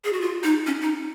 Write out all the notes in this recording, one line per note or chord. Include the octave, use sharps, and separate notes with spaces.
G#4
F#4
F4
D#4
C#4
D#4